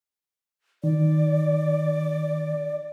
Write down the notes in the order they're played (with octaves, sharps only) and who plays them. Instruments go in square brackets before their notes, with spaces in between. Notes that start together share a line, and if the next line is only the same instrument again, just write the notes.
[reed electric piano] D#3 [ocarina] D5